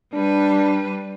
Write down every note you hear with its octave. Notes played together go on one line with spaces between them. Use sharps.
G3 D4 B4